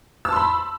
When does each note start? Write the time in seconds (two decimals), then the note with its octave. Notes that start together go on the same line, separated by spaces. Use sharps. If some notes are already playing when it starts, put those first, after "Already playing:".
0.25 E6
0.29 A5
0.32 C6
0.36 B5